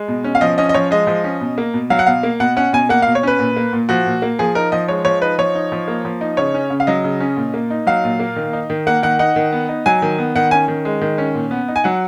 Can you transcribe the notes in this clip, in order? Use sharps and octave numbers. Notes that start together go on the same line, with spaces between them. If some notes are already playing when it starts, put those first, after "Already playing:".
Already playing: G#3
B2
C#4
F5
F3 D#5
C#4 D#5
D#5
F3 C#5
G#3 D#5
F3
C#4
B2
A#3
B2
F#3 F5
F#5
B2 F5
A#3
B2 F#5
C#4 F#5
B2 G#5
A#3 F#5
F5
B2
C#5
C#4 B4
A#2
A#3
A#2
F3 F#4
A#2
A#3
F3 G#4
D#4 A#4
F3 D#5
G#3 C#5
F3 C#5
D#4 B4
F3 C#5
D#4
F3
A#3
F3
D#4
C#3 C#5
C#4
C#3
F5
F#3 D#5
C#3
C#4
A#2
A#3
D#4
F#3 F5
A#2
A#3
D#3
D#4
D#3
A#3 F#5
D#3 F#5
D#4 F#5
D#3
B3
D#4
F#3 G#5
D#3
B3
D#3 F#5
C#4 G#5
D#3
G#3
D#3
C#4
A#2
B3
D#4
G#5
F#3 F#5